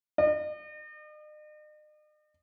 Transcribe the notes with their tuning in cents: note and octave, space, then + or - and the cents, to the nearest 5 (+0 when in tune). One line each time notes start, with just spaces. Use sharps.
D#5 -45